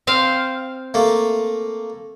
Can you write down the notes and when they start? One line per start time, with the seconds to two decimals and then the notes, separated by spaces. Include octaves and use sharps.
0.07 C4 C5 F5
0.94 A3 A#3